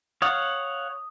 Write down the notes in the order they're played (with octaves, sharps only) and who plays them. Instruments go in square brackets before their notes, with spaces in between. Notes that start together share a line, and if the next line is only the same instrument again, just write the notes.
[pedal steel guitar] C#5 F5 F#5 [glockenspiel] D#6